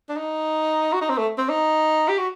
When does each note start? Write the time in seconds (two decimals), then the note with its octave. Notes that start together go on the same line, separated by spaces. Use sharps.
0.09 D4
0.17 D#4
0.93 F#4
1.01 D#4
1.10 C4
1.18 A3
1.38 C4
1.50 D#4
2.09 G4
2.18 F#4